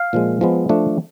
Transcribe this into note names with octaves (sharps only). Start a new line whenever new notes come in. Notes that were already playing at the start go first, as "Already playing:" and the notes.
Already playing: F5
A#2 F3 G#3
F3 G#3 B3
F3 A3 D4